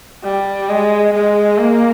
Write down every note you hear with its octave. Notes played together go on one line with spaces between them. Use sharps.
G3
G#3
G#3
A#3